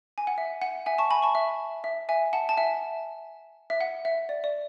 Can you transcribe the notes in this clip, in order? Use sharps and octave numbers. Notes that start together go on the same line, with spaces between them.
G#5
F#5
E5
F#5
E5 G#5
A5 C#6
G#5 B5
A5 C#6
E5
E5
E5 G#5
F#5 A5
A5
E5 G#5
E5
F#5
E5
D5
D5